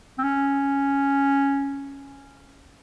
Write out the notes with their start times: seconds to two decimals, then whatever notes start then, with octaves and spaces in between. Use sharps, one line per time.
0.18 C4
0.24 C#4